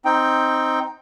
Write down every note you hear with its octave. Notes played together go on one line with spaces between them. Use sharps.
C4 D#4 G5